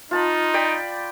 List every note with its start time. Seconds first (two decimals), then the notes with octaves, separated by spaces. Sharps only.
0.11 D#4 F4 A5 B5
0.54 D5 G5 B5